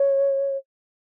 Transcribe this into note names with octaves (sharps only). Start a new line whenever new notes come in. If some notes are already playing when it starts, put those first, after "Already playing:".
Already playing: C#5